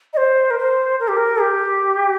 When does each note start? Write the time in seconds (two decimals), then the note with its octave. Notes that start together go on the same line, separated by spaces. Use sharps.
0.13 D#5
0.17 C5
0.50 A#4
0.59 C5
1.00 A#4
1.08 G4
1.16 A#4
1.41 G4